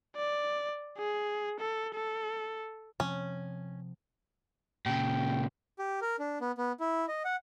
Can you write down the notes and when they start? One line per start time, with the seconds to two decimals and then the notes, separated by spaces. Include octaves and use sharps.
0.16 D5
0.98 G#4
1.59 A4
1.94 A4
3.00 C3 F3 C4 C#4
4.86 A#2 C#3 G5
5.79 G4
6.02 A#4
6.19 D4
6.41 B3
6.58 B3
6.80 E4
7.08 D#5
7.25 F#5